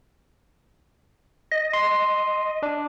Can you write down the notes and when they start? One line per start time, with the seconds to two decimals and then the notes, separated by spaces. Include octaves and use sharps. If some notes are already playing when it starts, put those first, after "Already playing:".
1.52 D#5
1.73 C6
2.63 D4